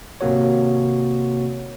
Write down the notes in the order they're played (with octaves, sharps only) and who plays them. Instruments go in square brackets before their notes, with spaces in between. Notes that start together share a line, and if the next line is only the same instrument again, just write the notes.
[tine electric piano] G#1 C3 A#3 F#4 C#5